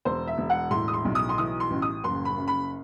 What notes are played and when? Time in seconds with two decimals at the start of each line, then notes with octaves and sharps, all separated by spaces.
0.05 E1 C5
0.27 E5
0.38 E1
0.50 F#5
0.71 A2 C6
0.88 D#6
0.94 C6
1.05 B1
1.15 D#6
1.29 C6
1.38 E3 D#6
1.60 C6
1.70 A1
1.82 D#6
2.04 F#1 C6
2.25 B5
2.36 F#2
2.48 B5